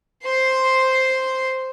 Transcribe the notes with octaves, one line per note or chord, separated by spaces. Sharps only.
C5 C6